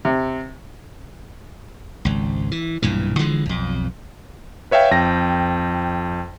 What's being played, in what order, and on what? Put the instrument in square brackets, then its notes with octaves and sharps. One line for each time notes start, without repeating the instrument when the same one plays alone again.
[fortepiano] C3
[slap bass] G#1 C#2
E3
B1 G2 A#2 E3
D3 E3 F3 G#3
B1 F2
[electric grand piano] B4 C#5 E5 F5 G5
F2 G5 A#6